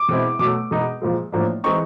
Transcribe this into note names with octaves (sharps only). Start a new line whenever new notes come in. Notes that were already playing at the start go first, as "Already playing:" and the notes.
Already playing: D6
B2 G#3 C4 E4
B2 F#3 A3 D6
B2 G#3 B3 D#4
A#2 F3 G#3
A2 F3 A#3 D4
E3 G#3 C4 D#4 C#6